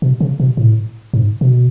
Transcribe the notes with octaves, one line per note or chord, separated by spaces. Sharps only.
B2
C#3
B2
A2
G#2
B2